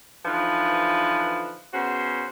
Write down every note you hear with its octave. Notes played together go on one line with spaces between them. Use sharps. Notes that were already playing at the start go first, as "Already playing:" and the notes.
D3 E3 F3 D#4 B4
C#3 B3 F#4 C5